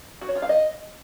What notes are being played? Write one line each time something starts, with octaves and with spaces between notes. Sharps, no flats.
F#4
C#5
F4
F5
D#5